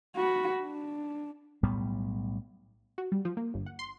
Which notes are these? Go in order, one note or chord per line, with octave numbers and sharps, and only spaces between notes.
F#4 B5
D4
B1 A2 G3 B3
F#4
G3
F3
A#3
G1
F#5
C6